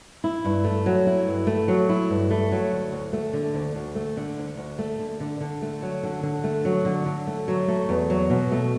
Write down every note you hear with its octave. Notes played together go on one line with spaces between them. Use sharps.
E4
G2
A3
F#3
E4
G2
A3
F#3
E4
G2
A3
F#3
D2
D2
A3
D3
D2
D2
A3
D3
D2
D2
A3
D3
D3
D3
A3
F#3
D3
D3
A3
F#3
D3
D3
A3
F#3
A3
E2
F#3
B2
A3